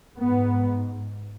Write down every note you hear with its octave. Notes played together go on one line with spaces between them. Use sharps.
G#2 B3